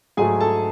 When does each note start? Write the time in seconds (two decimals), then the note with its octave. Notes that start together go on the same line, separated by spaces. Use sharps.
0.17 G#2 F#3 A3 G#4 G#5
0.41 A4 A5